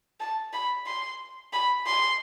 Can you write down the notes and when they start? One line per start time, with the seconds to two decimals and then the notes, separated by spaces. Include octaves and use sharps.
0.20 A5
0.53 B5
0.86 C6
1.53 B5
1.86 C6